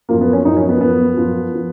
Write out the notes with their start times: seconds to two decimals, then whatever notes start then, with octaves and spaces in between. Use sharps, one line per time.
0.09 F#2 F3 A#3
0.21 B3
0.33 C#4
0.45 F#2 D#4
0.49 F3
0.57 C#4
0.69 B3
0.81 F#2 F3 B3
1.17 F#2 F3
1.54 F3